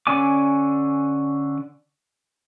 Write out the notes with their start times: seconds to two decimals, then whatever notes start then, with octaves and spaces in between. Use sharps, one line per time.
0.07 D3 C#4 D5 G#5 D6